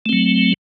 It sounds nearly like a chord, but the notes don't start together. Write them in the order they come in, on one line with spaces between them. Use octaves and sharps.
A3 C4 F#3